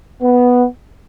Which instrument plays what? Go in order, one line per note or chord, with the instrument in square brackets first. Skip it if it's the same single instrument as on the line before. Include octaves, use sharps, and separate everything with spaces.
[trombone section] B3